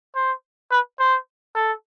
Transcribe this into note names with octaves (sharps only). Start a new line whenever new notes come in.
C5
B4
C5
A4